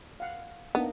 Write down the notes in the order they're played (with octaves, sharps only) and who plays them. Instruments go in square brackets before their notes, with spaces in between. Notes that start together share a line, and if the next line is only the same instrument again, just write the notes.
[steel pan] F5 F#5
[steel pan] A#3 D4 D#4 [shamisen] B3